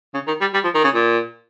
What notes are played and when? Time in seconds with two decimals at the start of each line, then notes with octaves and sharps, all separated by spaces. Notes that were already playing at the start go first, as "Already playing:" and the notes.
0.14 C#3
0.27 D#3
0.41 G3
0.54 G3
0.64 F3
0.74 D#3
0.84 C#3
0.94 A#2